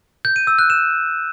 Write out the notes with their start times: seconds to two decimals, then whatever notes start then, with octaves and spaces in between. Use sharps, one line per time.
0.25 G6
0.36 D#7
0.47 E6
0.59 F#6
0.70 E7